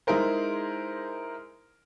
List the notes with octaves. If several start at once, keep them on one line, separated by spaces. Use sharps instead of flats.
G#3 D#4 E4 G#4 A#4 C5